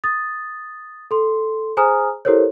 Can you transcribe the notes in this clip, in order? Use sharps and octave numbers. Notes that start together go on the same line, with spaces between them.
D#6 A6
A4 C6
G#4 C5 G#5 A#5 D#6 F6
E4 G4 A4 A#4 C5 C#5